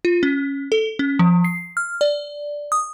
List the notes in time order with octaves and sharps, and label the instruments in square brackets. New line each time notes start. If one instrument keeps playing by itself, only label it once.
[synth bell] F4
C#4
A4
C#4
F3
C7
F6
D5
D#6